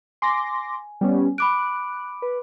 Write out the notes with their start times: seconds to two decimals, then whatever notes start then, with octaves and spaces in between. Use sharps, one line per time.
0.22 G#5 C6 D6 A#6
1.01 G3 B3 C#4
1.38 B5 D6 F#6 D7
2.22 B4